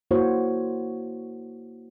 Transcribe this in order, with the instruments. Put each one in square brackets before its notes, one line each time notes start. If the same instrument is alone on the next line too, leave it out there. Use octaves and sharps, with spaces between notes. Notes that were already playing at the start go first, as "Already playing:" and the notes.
[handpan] A#3 E4 F#4 C5 C#5